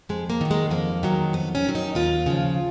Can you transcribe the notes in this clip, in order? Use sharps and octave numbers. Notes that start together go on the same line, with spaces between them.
F2 G#3
A#3
D#3 F#3
G#3
F2 A#3
D#3 F#3
F2 B3
C#4
D#3 F#3
D#4
D#2 F4
C#3 F3